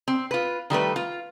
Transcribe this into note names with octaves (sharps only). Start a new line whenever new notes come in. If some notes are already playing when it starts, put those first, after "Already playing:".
C4
F4 B4
D#3 G3 A3 B4
F4